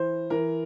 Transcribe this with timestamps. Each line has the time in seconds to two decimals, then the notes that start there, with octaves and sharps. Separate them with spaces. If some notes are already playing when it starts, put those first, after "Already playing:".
Already playing: E3 C5
0.30 E3 A#4